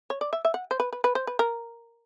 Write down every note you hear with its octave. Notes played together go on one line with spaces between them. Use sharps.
C#5
D5
E5
E5
F#5
C5
B4
B4
B4
C5
B4
A#4